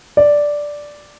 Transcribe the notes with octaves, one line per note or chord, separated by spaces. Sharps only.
D5